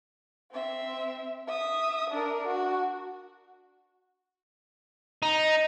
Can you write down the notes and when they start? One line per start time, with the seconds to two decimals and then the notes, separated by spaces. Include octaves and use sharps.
0.52 C4 E5
1.47 E5 D#6
2.10 D4 A#4
2.47 F#4
5.23 D#4